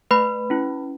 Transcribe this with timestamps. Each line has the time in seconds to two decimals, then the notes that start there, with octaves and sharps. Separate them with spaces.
0.11 A3 B4 B5
0.50 C#4 E4